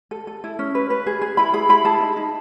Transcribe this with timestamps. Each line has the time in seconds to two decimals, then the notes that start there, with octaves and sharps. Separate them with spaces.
0.11 A4
0.27 A4
0.44 E4
0.59 C#4
0.75 B4
0.90 B4
1.06 G#4
1.22 G#4
1.37 E4 B5
1.53 G#4 B5
1.69 E4 B5
1.85 G#4 A5
2.01 D#4
2.16 D#4